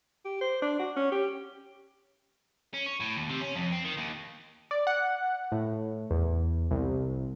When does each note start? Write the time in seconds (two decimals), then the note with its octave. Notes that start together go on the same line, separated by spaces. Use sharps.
0.25 G4
0.41 C5
0.62 D4
0.79 F#4
0.97 C#4
1.12 G4
2.74 C#4
2.86 C#5
3.00 A2
3.16 D#2
3.29 C3
3.41 C#4
3.56 F2
3.72 C4
3.85 D#3
3.98 D#2
4.71 D5
4.87 F#5
5.52 A2
6.11 E2
6.71 C2